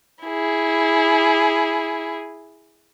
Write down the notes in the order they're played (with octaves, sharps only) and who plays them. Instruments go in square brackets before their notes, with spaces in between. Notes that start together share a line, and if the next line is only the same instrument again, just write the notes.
[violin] E4 G#4